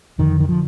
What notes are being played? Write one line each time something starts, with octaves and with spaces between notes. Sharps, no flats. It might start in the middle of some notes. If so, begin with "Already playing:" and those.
F2 D3 D#3
D#3
D3 F3